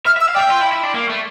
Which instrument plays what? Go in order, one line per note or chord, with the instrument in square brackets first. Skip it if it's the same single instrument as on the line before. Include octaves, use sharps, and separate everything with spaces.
[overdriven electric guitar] E5 [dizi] F6
[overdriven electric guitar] E5
[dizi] E6
[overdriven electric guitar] F5
[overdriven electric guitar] D5 E5 [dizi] G5
[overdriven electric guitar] F4
E4
E4
D4
A#3
A3